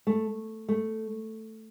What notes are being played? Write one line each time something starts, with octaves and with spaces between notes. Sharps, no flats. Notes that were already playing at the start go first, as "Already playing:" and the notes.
A3
A3